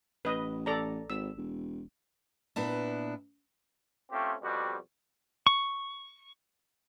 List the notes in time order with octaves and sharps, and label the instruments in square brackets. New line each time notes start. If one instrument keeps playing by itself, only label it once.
[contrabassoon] A1 [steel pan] B4 D#5
[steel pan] A4 D5 A#5
[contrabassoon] G#1 [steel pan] E6
[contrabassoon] E1
[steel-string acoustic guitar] A#2 B3 D4 E4
[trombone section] A3 C4 C#4 F4 G4
F2 B2 G3 F#4 G4
[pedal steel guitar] C#6